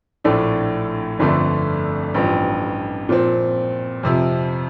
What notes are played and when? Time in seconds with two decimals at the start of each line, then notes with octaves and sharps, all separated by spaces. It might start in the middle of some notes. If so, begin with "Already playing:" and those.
0.24 A#1 A2 A3 D4
1.19 G1 F2 D3 A3
2.14 A1 G2 F3
3.09 A#2 F3 C4
4.03 F2 C3 F3